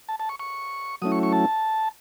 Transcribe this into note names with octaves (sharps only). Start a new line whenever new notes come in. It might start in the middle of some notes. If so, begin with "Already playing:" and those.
A5
A5
C#6
C#6
F#3 A3 C#4 E4 D#6
C#6
C#6
A5